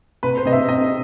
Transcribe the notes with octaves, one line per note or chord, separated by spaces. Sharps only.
C3 B4
C5
C3 D#5
E5
C3 D#5